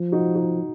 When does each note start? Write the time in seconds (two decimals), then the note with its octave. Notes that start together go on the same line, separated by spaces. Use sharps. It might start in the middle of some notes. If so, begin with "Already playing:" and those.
Already playing: F3
0.12 D#4 F#4
0.35 D#4 F#4